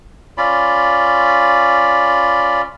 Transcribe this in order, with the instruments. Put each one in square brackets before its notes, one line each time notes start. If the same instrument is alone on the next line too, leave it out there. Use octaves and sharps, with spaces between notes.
[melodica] C#4 F4 D5 B5